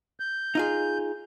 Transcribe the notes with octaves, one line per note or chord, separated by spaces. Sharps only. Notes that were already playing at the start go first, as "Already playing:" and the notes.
G6
D#4 F4 G#4